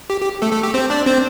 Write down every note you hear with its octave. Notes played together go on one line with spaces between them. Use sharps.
G4
G4
A3 A4
A3 A4
G4
C4 C5
D4 D5
C4 C5